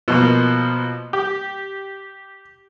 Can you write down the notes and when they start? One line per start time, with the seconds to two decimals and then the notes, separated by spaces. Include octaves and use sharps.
0.08 B2 F3 A#3
1.13 G4